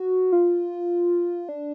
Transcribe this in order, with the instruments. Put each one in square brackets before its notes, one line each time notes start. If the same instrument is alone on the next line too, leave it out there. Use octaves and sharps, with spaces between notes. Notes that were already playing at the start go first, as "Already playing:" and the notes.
Already playing: [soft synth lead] F#4
F4
D4